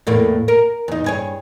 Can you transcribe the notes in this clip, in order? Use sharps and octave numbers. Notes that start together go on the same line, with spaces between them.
E2 A2 A#3
A#4
E2 D#4
G2 G#4 C#5